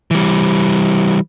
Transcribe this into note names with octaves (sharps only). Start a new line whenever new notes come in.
E3 G3